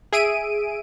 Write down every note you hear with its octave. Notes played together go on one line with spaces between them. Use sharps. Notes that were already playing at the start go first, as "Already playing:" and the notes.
G#4 E5 D7 D#7